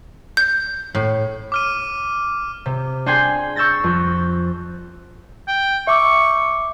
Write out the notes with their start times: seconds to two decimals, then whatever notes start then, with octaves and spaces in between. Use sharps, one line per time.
0.37 G6
0.95 A2
1.52 D6 F6 D#7
2.66 C3
3.06 D4 G#4 G5 C6 G#6 C7
3.56 C#6 E6 G6 A6 A#6
3.84 F2
5.47 G5
5.87 E5 C#6 D6 E6